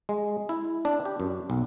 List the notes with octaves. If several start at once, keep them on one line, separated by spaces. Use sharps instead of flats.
G#3
E4
D4
G4
F#2
B1